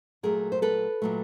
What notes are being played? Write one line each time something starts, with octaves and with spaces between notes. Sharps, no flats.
A#2 F#3 A3 G#4 A#4
C5
A4 B4
A#2 F#3 A3